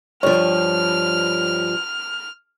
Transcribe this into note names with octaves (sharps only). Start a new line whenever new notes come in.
G2 F3 C#5 F6